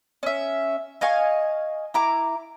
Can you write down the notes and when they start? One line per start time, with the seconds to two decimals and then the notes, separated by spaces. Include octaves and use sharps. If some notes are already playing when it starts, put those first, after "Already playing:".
0.23 C#4 E5
1.01 D#5 F5 G#5 C#6
1.94 E4 A#5 D6